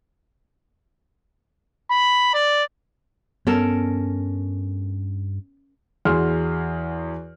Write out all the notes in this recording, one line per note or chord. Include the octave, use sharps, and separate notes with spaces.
B5
D5
G2 B3 C#4 A4 A#4
E2 F#4 G#4 C6 F6